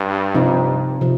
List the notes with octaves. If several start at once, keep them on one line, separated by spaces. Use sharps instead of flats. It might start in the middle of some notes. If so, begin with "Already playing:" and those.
Already playing: G2
C3 F3 C4 D#4
C3 F3